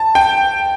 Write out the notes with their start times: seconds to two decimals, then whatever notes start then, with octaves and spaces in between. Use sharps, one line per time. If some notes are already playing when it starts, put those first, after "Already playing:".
Already playing: A5
0.15 G5